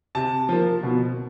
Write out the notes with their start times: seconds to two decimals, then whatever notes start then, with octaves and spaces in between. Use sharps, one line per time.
0.15 C3 A5
0.49 F3 A#3
0.83 B2